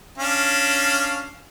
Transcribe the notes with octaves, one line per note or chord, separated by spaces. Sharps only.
C#4 D4 F5